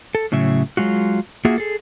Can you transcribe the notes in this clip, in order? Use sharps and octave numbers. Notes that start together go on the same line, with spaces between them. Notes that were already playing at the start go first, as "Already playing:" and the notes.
A4
A2 C#3 F#3 E5
F#3 G#3 F4 F#4
A#3 F4 F#4 G#4 E5
G#4 A4